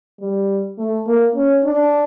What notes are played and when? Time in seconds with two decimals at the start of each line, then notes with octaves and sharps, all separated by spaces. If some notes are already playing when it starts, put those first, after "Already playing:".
0.20 G3
0.78 A3
1.07 A#3
1.36 C#4
1.65 D4